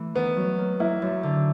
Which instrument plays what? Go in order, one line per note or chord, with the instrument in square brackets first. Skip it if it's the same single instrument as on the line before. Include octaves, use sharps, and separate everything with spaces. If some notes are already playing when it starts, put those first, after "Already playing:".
Already playing: [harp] E3 A3
[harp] D#3 [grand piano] B3
[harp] F#3
A#3
[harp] A#3 [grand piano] E4
[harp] F#2
D3